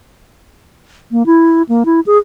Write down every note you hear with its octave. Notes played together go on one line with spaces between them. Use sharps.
A#3
E4
A#3
E4
G#4